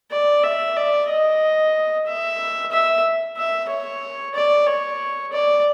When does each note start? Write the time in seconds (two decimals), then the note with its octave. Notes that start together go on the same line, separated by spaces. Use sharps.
0.12 D5
0.44 E5
0.76 D5
1.09 D#5
2.06 E5
2.72 E5
3.37 E5
3.70 C#5
4.35 D5
4.68 C#5
5.33 D5